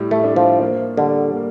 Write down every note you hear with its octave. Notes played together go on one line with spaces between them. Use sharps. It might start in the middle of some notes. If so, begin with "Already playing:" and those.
Already playing: A2 G3
A3
D4
F3
A#3
D3 G3
A#3